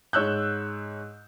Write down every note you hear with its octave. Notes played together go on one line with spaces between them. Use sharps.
G#2 C#5 E6 F#6 G6